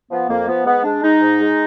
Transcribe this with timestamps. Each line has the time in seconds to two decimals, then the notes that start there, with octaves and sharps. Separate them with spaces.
0.11 F3 B3
0.29 F2 A#3
0.47 F3 B3
0.66 G#2 B3
0.84 G#3 D4
1.03 G#3 D#4
1.21 G#2
1.40 G#3